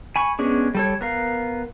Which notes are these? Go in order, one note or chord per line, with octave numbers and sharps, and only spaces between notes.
G#5 B5 C#6
G#3 B3 C#4 D4 G#4
G3 A4 C#5
B3 A#4 F5